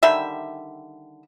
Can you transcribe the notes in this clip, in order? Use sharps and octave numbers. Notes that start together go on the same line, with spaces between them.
D3 D#3 G3 E5